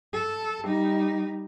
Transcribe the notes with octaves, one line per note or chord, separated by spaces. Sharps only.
A4
G3 D#4